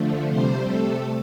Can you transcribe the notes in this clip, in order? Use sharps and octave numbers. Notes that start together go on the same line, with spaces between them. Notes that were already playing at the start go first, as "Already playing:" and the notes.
Already playing: D3 F3 A3
C3 G3 C5
C3 A3 A4